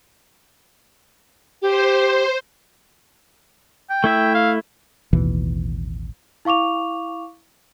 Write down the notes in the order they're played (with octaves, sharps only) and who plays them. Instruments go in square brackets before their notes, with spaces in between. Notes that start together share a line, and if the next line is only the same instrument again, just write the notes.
[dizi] G4 [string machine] C5
[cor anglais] G5
[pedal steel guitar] A3 E4 E5
[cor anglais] F5
[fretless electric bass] A1 D#2 B2 E3
[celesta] E4 F5 C#6 D6 F7